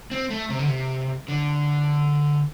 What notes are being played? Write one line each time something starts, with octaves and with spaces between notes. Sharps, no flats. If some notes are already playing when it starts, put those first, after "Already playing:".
C4
A3
C3
D3
C3
D3